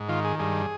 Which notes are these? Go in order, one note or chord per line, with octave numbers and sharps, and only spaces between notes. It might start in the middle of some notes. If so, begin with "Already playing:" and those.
Already playing: G#2
D#3 F4
G#4
G2 G#4